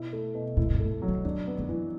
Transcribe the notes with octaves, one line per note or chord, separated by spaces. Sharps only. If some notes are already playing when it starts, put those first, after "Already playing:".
Already playing: B2 E4
A3
B2
A2 E4
A2
G#2
A3
F#3
C#3
E2 D4
B3
F#2
E3